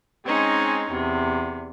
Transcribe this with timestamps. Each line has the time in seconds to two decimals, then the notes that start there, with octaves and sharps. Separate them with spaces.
0.24 G#3 C4 C#4 D#4
0.91 E2 C3